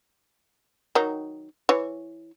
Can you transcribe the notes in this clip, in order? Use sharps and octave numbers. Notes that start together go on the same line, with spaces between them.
D#3 F#3 D#4
E3 C#5